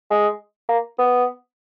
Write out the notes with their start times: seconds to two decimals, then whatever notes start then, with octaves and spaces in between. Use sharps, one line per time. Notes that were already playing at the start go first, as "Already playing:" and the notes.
0.10 G#3
0.69 A#3
0.98 B3